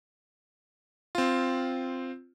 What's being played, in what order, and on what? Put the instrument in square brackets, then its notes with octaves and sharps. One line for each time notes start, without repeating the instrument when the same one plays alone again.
[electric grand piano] C4 F4